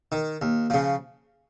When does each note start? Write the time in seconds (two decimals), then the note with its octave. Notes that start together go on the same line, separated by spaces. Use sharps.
0.12 D#3
0.42 D#2
0.70 C#3 F3